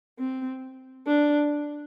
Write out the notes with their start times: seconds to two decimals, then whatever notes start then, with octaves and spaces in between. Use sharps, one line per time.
0.19 C4
1.07 D4